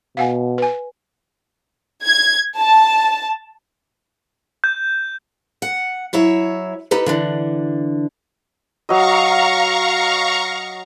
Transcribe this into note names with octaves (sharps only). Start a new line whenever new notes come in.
B2 F5 F#5 G#5
B4 G#5
G#6
A5
G6
F#5
F#3 E4 C#5 E5
D#4 G4 A4 B4
D3 E3 D4
F#3 D#5 F5 A#5 C#6